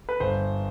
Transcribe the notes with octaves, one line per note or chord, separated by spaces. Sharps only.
B4
G1 C5